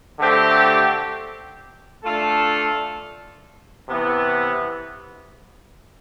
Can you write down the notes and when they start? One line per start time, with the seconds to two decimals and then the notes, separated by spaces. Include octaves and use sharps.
0.20 D3 A3 C4 G4
2.04 A3 D4 F4 A4
3.88 C3 E3 B3